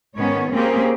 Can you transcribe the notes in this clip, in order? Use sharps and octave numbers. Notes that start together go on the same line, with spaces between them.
G#2 D#3 B3 C#4 C#5
A#3 C4 C#4 G4 G#4